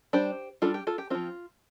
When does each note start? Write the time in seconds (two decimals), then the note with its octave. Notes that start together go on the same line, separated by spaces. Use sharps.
0.13 G3 D4 G4 C5
0.62 G3 D4 F4 A4
0.74 G4
0.87 F4 A4
0.98 G4
1.10 F3 C4 F4